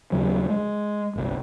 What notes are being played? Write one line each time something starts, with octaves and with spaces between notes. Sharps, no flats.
D#2 C#3 F#3
G#3
G1 C2